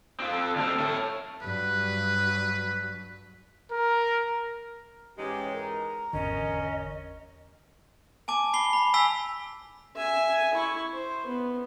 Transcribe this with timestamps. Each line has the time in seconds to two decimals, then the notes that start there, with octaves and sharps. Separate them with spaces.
0.20 C4 F4
0.32 A4
0.56 D2 C4 A4 F6
0.80 C#5 E5
1.42 G2 F#3 B4
3.72 A#4
5.17 G#2 E3 G#3 C#4 G4
5.53 A#4
6.13 G#1 E2 D3 C#4 D#5
8.28 G#5 A5 D6
8.53 B5 C7 G7
8.73 B5
8.94 G#5 E6 B6 G7
9.97 E5 G#5
10.54 E4 C#6
10.93 C5
11.26 B3